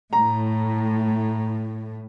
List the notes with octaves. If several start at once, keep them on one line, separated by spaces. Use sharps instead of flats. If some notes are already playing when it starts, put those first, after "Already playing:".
A2 A#5